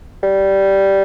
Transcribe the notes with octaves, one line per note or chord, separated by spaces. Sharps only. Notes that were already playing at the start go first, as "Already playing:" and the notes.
G3